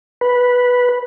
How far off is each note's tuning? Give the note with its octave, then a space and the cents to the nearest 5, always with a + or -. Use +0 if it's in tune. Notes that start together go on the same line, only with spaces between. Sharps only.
B4 -5